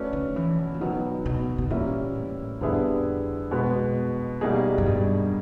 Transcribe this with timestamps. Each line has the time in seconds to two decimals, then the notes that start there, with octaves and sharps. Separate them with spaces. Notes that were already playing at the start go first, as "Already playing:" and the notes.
Already playing: A3 C#4 F#4 B4 D5
0.13 D#3
0.36 E3
0.58 B2
0.74 A#2
0.80 B2 D#3 F#3 B3
1.25 B2
1.58 B2
1.70 A#2 E3 G3 A#3 C#4 E4
2.15 A2
2.61 F2 D3 G3 B3 E4 G#4
3.51 B2 G#3 B3
4.41 F#2 B2 G3 A#3 D#4 G#4
4.78 F#2
4.86 G2